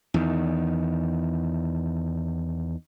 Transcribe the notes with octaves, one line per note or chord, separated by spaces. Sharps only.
E2 D#3